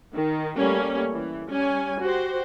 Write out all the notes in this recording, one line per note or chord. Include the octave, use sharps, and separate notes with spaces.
D#3
G3 A3 A#3 C#4
E3
G3 C#4 G#5
F#4 G4 C5